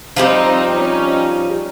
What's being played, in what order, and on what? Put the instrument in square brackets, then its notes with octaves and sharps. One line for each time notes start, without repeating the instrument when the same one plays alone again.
[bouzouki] F3 G3 G4 [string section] C4 D#4
[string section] C#4 D#4